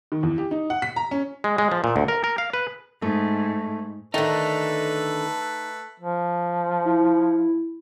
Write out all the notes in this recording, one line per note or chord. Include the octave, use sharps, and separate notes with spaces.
D#3
E2
G4
D#4
F#5
B6
A#5
C#4
G#3
G#3
F3
A#2
D2
A#4
A#4
F5
B4
G#2 A3
D3 D#3 A3 D#4 A4 B4
F3
E4